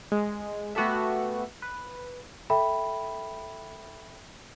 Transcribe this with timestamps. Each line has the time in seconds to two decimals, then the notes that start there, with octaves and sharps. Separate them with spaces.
0.12 G#3
0.75 A3 B3 F#4 G4 A4 E5
1.62 B4
2.50 A4 E5 G5 B5